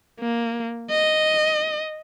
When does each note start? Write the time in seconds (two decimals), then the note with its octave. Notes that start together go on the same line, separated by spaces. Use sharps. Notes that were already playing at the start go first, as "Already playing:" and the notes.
0.20 A#3
0.91 D#5